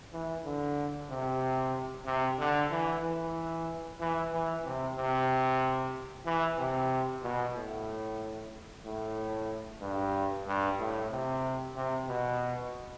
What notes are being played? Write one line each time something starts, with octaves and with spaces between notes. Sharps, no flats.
E3
D3
C3
C3
D3
E3
E3
E3
E3
C3
C3
E3
C3
B2
A2
A2
G2
G2
A2
C3
C3
B2